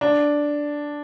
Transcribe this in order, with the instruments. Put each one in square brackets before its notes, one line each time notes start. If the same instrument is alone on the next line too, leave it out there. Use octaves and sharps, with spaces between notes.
[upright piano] D4